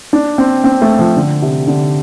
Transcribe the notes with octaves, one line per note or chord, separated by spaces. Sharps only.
D4
C4
C4
A3
F3
D3
C3
D3